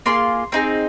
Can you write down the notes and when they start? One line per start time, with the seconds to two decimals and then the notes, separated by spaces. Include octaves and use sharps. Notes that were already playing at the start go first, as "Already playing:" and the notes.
0.06 A#3 F4 G#4 C6
0.52 C4 D#4 G#4